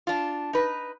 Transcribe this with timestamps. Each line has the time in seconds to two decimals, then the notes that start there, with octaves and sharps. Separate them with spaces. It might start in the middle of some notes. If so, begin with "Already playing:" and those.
0.07 D4 F4
0.53 D#4 B4